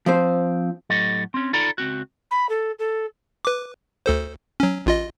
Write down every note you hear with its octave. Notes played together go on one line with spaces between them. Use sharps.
F3 C4 C5
A2 F#3 G4 A4 D#5
C4 C#4
D#4 F4 A4 D5 A#5 B5
C#2 C4 F#4
B5
A4
A4
B4 D6
D2 A4 C5
F#3 C#4
A1 F4 D#5